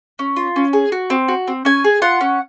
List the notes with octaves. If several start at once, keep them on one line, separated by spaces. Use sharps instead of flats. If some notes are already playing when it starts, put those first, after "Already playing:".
C#4
F4
C#4
G#4
F#4
C4
F#4
C4
C#4 G#5
G#4
F4 F#5
C#4